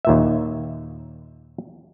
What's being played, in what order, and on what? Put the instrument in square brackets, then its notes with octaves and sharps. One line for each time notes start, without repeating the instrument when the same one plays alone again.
[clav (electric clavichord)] D#2 A#2 E5